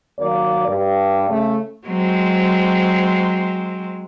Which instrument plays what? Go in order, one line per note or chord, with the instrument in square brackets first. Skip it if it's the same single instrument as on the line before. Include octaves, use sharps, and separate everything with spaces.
[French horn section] D#2 F#3 A#3 D5
G2
C#3 A3
[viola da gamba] F#3 G#3 C4